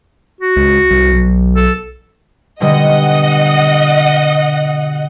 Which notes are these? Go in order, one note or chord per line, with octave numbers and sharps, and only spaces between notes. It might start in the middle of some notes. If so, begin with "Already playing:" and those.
F#4
C#2
C2
B1
A4
B2 D3 G3 D#5 F#5